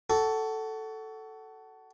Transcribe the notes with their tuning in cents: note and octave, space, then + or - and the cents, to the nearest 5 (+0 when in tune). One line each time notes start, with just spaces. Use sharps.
F#4 +25 A4 +0